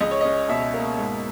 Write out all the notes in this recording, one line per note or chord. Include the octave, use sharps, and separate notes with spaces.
C#2 D#5
C#5
D#5
C#4
B2 E5
A#3
G#2